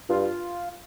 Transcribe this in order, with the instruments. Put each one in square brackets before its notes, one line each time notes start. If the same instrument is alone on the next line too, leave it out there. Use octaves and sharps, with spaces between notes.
[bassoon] G2 [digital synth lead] F4